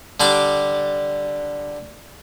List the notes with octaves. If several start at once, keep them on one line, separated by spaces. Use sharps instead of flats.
D3 G3 D4 D6